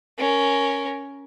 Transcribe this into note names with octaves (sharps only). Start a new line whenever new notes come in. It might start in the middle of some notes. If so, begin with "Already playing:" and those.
C#4 A#4